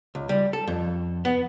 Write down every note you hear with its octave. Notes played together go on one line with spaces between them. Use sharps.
C#2
G3
A4
F2
B3